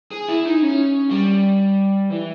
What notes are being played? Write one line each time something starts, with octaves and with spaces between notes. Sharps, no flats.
G#4
E4
D#4
C#4
G3
E3